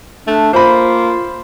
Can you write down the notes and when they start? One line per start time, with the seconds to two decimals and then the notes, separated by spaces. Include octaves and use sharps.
0.27 A3 D4
0.53 A#3 F4 C5 B5